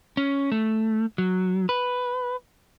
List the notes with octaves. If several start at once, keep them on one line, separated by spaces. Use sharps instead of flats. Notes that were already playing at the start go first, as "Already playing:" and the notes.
C#4
A3
F#3
B4